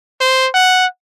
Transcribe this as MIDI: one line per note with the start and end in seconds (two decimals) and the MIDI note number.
0.20 0.48 72
0.54 0.86 78